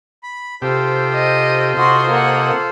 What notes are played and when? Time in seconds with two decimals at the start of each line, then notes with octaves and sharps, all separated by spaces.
0.23 B5
0.62 C3 F4 G4 A4 C5
1.14 D#5
1.77 C3 F#4 D#5 C6
2.09 A#3 F#5